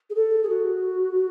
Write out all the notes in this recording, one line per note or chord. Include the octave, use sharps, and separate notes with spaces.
G#4
A4
G#4
F#4